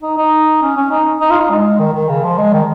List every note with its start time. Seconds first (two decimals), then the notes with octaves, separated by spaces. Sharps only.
0.03 D#4
0.17 D#4
0.62 C#4
0.77 C#4
0.91 D#4
1.21 D#4
1.31 F4
1.40 D#4
1.50 G#3
1.79 D#3
1.94 D#3
2.09 C#3
2.23 F3
2.38 G#3
2.53 D#3